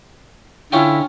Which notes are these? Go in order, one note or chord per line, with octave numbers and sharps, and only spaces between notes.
D3 C#4 E4 F4 G5